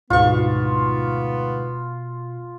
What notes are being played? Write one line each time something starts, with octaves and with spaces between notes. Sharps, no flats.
D2 G#2 B2 B3 F4 C#6